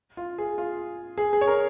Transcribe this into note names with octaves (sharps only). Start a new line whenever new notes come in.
F4
G#4
F4
G#4
G#4
C#5
A#4